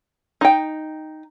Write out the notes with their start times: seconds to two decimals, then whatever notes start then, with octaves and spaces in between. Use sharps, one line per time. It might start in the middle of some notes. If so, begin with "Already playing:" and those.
0.41 D#4 G5